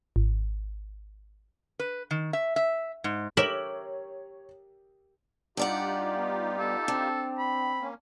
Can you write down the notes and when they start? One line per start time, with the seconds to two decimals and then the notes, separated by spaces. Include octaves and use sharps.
0.16 G#1
1.79 B4
2.11 D#3
2.33 E5
2.56 E5
3.04 G#2
3.37 G4 A#4 C#5 E5 F#7
5.57 G2 D#4 F4 G4 D5 F#5
6.15 B3
6.59 B3 A4
6.88 C4 D4
7.39 B5
7.81 A#3 C#4